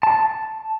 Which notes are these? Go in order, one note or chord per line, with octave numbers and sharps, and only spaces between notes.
A5